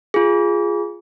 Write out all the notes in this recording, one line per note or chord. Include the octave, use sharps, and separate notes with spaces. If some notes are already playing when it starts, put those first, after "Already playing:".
F4 G#4